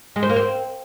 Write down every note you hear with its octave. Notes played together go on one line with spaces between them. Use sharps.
G#3
C5
A#3
C4